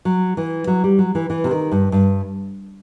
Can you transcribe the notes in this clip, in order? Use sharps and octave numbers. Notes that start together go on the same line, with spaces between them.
F#3
E3
F#3
G3
F#3
E3
E3
C3
D#3
G2
G2